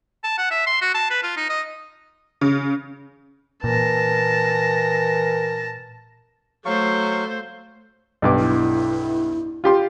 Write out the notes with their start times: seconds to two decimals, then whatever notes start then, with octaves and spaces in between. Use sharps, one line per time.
0.24 A5
0.38 F#5
0.51 E5
0.66 C6
0.82 F#4
0.94 A5
1.10 B4
1.23 F4
1.37 D#4
1.49 D#5
2.41 C#3
3.64 A#2 E3 A#4 A5 A#6
6.65 F#3 A3 C5 F5 C#6
8.22 B1 G2 D6
8.39 E4
9.64 F4 G4 C6